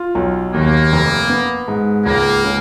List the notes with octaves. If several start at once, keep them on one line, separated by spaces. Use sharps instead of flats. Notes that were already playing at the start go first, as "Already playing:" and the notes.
Already playing: F4
B1
D#2 A#3
F1
B3
G#2
C#2 A#3
C#3